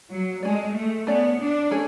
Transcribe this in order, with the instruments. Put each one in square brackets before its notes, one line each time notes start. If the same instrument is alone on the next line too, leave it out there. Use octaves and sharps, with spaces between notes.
[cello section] F#3
[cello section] G#3 [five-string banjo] A3 C#4 G#4 D5
[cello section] A3
[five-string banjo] A3 C#4 G#4 D5 [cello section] B3
[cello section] D4
[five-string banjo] A3 C#4 G#4